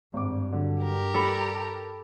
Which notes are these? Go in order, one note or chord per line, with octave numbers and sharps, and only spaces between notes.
G#1 G2 D6
D3 F#3
G4 A#4
G3 A4 B5
A5